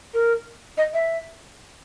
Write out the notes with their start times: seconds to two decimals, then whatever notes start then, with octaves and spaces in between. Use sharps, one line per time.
0.14 A#4
0.78 D#5
0.94 E5